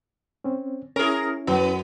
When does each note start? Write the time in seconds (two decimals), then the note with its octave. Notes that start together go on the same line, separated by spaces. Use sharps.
0.44 C4 C#4
0.96 C#4 E4 G#4 A#4
1.47 F#2 B3